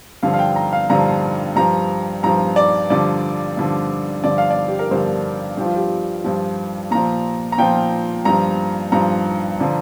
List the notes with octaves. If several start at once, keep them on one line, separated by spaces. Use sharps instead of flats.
G2 D3 F3 F5
F5
G5
A#5
F5
G2 D3 F3 A#5
G2 F3 A#5
G2 F3 A#5
D5
G2 D3 F3 D5
G2 D3 F3
G2 D3 F3 D5
F5
D5
G4
A#4
G2 D3 F3 C5
G2 F3 G4
F4
G4
G2 F3
A#2 F3 A#5
A#5
A#2 F3 G5
G2 F3 A#5
G2 F3 A#5
D3 F3